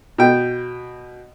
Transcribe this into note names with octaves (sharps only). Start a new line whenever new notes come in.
B2 G5